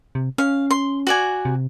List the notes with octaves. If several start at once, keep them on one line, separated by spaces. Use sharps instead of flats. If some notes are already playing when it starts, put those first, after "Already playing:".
C3
C#4 F5
C6
F#4 D5 G#5
C3